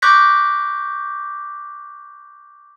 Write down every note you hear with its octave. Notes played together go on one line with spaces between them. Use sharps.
C#6 D6 F#6 G6 A#6 B6